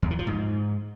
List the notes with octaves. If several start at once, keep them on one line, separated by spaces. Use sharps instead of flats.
E2
E3
F3
G#2